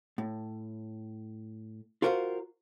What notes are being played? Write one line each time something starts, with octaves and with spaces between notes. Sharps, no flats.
A2
F4 F#4 A#4 C5 D#5 F5